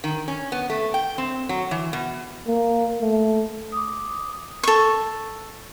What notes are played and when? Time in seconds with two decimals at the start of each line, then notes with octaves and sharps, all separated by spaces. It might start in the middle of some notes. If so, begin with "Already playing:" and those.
0.04 D#3
0.28 C#4
0.52 B3
0.70 A3
0.94 G5
1.18 C4
1.49 F#3
1.71 E3
1.93 B2
2.47 A#3
3.01 A3
3.72 D6 D#6
4.63 A4 C#6